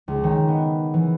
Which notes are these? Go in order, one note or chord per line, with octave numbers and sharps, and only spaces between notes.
C#2
D#3
B3
E3